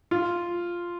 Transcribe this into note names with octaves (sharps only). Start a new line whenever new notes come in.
F4